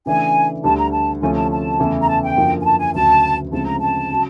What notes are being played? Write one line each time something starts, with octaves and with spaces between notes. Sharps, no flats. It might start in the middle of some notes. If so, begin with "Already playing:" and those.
C#3 E3 A3 D4 G#5
D2 D3 G3 A5
A#5
A5
D2 C3 F3 A3 C#4 G#5
A5
A5
E2 C#3 E3 A3
A#5
A5
G5
F#2 D3 F3 A#3
G#5
A5
G#5
D2 C#3 F#3 A5
D2 C#3 F3 G#3 C4 A5
A#5
A5
C#3 F#3